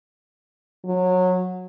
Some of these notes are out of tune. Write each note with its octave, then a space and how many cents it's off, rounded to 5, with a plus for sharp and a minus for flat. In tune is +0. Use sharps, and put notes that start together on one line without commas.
F#3 -20